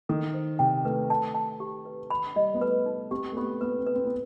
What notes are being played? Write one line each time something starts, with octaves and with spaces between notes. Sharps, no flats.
D#3 A4
C5
C3 G5
A3 B4
A5
A5
G4
B4
B5
G3 D#5
B3
A3 B4
D#4
C4 G4
A3
B3 G4
B3 B4
C4
B4
C4
B3